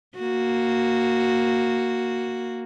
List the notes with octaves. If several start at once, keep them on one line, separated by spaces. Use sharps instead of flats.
A#3 F#4